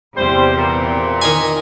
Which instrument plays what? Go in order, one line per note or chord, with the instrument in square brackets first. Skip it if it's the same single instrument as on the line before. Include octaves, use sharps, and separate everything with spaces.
[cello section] E2 C3 C4 [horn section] G3 C5
[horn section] A#2
[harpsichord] D#3 D#5 G#5